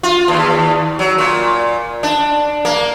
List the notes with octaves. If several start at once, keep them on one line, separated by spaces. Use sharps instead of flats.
F4
D#2
F#3
A#2
D4
A#3